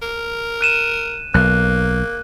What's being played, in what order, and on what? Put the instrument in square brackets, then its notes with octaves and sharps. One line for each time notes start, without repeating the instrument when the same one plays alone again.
[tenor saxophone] A#4
[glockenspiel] F#6 D#7 E7
[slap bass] B1 [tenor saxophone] A#3 [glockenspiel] F#6